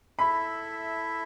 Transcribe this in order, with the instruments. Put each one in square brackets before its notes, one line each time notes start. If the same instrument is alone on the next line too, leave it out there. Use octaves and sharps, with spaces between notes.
[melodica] E4 A4 E5 [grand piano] B5